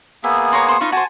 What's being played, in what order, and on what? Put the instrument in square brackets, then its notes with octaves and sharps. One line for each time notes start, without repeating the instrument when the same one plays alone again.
[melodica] A#3 B3 G#4 [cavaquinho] E5
[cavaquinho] C#5 A#5 C6
C5 C#6
[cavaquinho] D#4 B4 [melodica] F4 C#6
[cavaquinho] F#4 C5 [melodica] G#5 A5